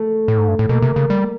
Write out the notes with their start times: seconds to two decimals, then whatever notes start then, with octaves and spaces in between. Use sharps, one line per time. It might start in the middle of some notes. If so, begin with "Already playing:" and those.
Already playing: A3
0.28 A2
0.38 G#2
0.48 G2
0.59 A2
0.69 B2 A#3
0.82 C3
0.96 C#3
1.10 G3